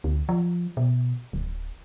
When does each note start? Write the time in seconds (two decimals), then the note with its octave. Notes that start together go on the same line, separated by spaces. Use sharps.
0.04 D2
0.29 F3
0.77 B2
1.33 D1